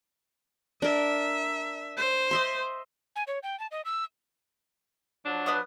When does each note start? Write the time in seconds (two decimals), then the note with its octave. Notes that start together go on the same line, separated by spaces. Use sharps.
0.82 D4 A#4 E5
1.98 C5
2.31 D#5 E5 C6
3.16 G#5
3.27 C#5
3.43 G5
3.59 A5
3.71 D#5
3.85 E6
5.25 F3 F#3 D4
5.46 B4 D#6 F6